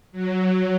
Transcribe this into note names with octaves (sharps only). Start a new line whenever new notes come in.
F#3